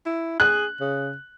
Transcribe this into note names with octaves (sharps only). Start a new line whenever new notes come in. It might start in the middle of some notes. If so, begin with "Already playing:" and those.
E4
G#4 F#6
C#3